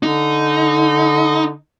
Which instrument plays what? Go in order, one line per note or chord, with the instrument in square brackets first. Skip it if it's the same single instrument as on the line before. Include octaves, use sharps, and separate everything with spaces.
[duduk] D3 [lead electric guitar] D#4